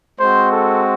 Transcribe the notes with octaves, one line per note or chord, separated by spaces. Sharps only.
G#3 C4 F#4 C5
A4